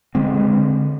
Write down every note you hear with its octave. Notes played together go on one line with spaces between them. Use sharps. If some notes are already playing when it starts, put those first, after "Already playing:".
D3 G#3 C4
D3